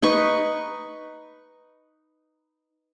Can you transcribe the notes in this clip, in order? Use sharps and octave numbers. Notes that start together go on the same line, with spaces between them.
D#4 B4 C#6